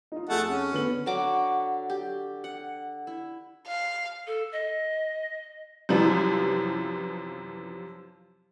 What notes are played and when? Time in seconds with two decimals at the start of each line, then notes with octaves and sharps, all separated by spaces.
0.12 D#4 F4
0.29 F2 A3 G#4 F#5 A5
0.48 C#4
0.72 D3 B3 F#7
1.06 D3 F#3 F#4 D6
1.90 G4
2.44 F#5
3.07 E4
3.67 F5
4.27 A4
4.52 D#5
5.89 F#2 C3 E3 F3 G3